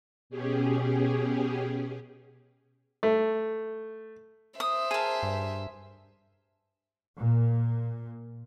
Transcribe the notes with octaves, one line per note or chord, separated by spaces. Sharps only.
B2 C#4 G4 G#4
A3
C5 E5 D#6
G#4 A#4 G#5 A5
G2
A#2